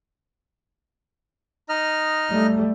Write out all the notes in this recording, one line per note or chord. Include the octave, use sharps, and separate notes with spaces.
D#4 D#5 F6
G3 A3